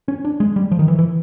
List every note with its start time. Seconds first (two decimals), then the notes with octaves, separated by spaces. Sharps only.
0.08 C#4
0.25 D4
0.40 G#3
0.56 G3
0.71 F3
0.79 D#3
0.88 E3
0.99 E3